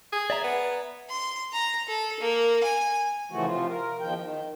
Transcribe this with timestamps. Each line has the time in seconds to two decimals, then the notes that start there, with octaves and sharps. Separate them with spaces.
0.12 G#4
0.30 D5 E5 A#5
0.44 B3
1.09 C6
1.52 A#5
1.88 A4
2.20 A#3
2.63 G#5
3.31 C#3 E3 F3 A3 F#4
3.46 C3 F3 F4
3.68 A#4
4.01 E2 D#3 F3 G5
4.20 D#3